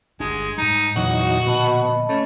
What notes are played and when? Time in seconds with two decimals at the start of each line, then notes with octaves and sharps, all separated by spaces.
0.20 G1 G#3 D4
0.58 G#2 G3 D#4
0.96 E2 A#2 D3 F3 F#3 D#4 F#4
1.47 B2 D#5 A5 B5
2.09 A3 C#4